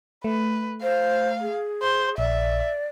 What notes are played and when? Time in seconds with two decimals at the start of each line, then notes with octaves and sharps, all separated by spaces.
0.24 A3 B4
0.83 C5 F5
1.42 G#4
1.82 C5
2.18 A#1 D5 E5